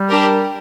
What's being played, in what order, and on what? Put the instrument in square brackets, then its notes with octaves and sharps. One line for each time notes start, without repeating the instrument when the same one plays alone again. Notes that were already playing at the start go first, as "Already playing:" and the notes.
Already playing: [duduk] G3
[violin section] D4 G4 A#4